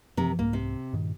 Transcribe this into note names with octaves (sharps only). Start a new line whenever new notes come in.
F#2 C3 E3 F3 A#4
C2 G#2 A#3
C3
G2 A#2 D#3